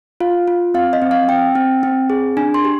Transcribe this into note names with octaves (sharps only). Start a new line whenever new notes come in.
F4 F5
F4
C4 F5
D#5
C4
F5
C4 G5
C4
C4
G#4
D4 G#5
C6
G4